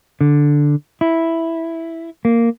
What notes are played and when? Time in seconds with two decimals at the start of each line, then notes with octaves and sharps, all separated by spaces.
0.21 D3
1.01 E4
2.25 A#3